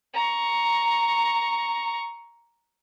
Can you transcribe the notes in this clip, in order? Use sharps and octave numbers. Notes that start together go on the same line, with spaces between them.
A#5 C#6